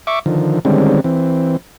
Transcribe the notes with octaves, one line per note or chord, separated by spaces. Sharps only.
E5 C#6 D6
D3 D#3 F3
D3 D#3 G3 G#3 C4 C#4
E3 C4